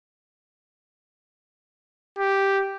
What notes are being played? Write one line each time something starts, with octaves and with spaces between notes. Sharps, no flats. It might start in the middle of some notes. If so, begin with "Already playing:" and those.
G4